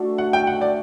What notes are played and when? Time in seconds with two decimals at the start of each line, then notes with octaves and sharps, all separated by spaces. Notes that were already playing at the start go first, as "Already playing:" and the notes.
Already playing: A3 D4 F#4 A4
0.18 F#5
0.33 G5
0.47 F#5
0.61 D5